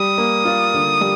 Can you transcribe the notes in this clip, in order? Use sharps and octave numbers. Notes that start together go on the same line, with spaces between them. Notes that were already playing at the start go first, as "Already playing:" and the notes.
Already playing: G3 D#6
A#3
F4
D3
G3